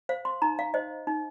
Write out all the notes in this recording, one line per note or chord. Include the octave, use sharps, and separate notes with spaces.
C5 F5
C6
D#4 A#5
F5
C5 D#5
D#4